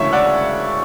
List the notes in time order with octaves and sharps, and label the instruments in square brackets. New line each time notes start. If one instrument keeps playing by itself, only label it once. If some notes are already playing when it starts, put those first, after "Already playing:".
Already playing: [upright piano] E1 D2 C#3 E3 C#5 E5
D5 F#5